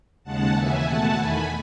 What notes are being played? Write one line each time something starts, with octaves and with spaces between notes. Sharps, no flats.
D#2 C#3 G#3 F#5 A5
D#2 C#3 E3 E5 G#5
B2 A3 F#5 A5
E2 D#3 A3 G#5 B5